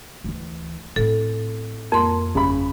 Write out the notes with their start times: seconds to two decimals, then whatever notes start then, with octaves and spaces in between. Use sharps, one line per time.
0.24 D2 E3
0.96 A2 C4 A4
1.92 F2 A#3 C6
2.35 G1 C#3 B5